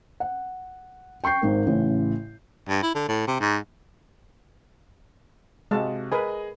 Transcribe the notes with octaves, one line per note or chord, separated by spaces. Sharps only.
F#5
G5 C#6 G6 C7
G#1 G#2 A#4
A1 A2 C#3
G2
E4
D3
A2
C3
G#2
C3 G#3 F#4 F5 A5
G#4 A#4 B4 D#5 G#5